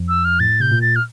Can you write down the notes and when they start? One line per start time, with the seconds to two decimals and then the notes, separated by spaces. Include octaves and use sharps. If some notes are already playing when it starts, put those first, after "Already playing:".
Already playing: F2 F3
0.09 E6
0.25 F6
0.40 A2 A6
0.60 C3 G6
0.71 A#2
0.82 A6
0.96 F6